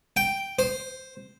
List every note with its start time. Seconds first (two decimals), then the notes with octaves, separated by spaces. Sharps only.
0.17 G5
0.59 C5